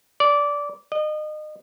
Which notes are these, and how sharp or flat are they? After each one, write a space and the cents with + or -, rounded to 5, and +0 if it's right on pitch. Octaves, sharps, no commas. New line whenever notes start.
D5 -15
D#5 -30